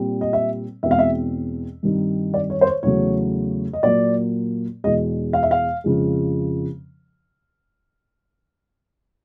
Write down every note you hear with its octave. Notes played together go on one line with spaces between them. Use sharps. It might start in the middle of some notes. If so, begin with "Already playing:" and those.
Already playing: A#2 G3 C4
D#5
E5
E2 B2 G#3 C4 E5
F5
E5
G2 D#3 G3 C4 D#4
D5
C#5
C5
C#5
E2 C#3 F#3 A3 C#5
D#5
A#2 F#3 A#3 D5
E2 B2 G#3 D#5
F5
E5
F5
F2 C#3 F3 G#3